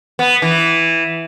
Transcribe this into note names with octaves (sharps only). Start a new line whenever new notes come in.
B3
E3